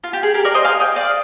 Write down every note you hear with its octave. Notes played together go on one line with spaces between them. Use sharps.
F4
G4
G#4
G4 A#4
A#4 D5
C5 D#5
F5 G#5
D#5 G5
D5 F5